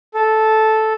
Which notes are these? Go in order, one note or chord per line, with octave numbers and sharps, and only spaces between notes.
A4